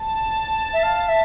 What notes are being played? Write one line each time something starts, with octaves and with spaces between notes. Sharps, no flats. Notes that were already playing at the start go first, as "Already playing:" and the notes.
Already playing: A5
E5
F5
E5